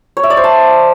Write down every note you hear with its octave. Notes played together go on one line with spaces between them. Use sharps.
C#5
E5
D5
C5
A5